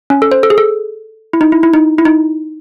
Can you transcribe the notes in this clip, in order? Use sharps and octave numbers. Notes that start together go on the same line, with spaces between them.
C#4
A4
C5
A4
G#4
A4
E4
D#4
E4
E4
D#4
E4
D#4